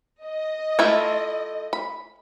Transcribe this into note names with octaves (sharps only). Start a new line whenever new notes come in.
D#5
A3 E4 F4
B5